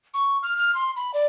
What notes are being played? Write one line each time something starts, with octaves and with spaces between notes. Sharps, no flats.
C#6
F6
F6
C6
B5
D5